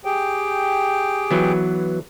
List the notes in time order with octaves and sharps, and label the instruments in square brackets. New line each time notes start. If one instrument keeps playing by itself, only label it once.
[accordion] G4 G#4 G5
[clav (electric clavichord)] E3 F#3 B3